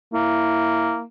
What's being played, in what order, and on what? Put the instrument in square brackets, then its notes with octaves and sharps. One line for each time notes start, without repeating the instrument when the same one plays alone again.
[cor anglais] A#3 [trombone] E4